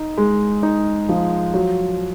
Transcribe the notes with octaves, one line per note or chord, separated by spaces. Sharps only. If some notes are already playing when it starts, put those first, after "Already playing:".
Already playing: D#4
G#3
D#4
F3
F#3